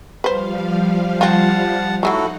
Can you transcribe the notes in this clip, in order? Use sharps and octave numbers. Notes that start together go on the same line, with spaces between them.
F3 G3 B4 C5 F5
C4 F4 F#5 A5
F#3 G#3 A3 D#4 E4 F#4 A4 F#5